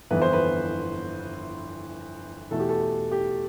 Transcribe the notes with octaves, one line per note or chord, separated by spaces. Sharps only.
G1 F2 E3 B3 B4
C5
B4
E2 B2 A3 A4
G4
A4
G4